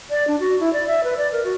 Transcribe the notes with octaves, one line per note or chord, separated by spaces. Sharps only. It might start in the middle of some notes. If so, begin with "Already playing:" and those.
D5
D4
F#4
E4
D5
E5
B4
D5
A#4
F#4